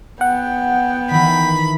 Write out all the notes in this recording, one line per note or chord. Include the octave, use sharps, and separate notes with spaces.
B3 F#5 G5
D#3 E3 B5